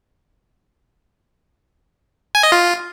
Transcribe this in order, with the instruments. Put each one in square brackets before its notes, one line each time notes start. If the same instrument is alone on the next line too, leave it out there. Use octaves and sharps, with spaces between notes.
[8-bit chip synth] G#5
D#5
F4